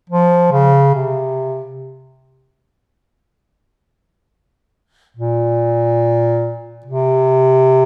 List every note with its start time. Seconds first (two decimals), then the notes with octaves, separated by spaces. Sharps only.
0.09 F3
0.52 C#3
0.95 C3
5.17 A#2
6.85 C3